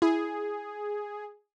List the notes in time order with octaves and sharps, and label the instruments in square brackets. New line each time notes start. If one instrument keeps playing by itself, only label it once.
[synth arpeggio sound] E4 [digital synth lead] G#4